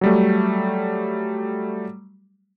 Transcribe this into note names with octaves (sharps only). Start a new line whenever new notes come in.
F#3 G3 A3